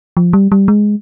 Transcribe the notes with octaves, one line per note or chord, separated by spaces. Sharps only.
F3
G3
G3
G#3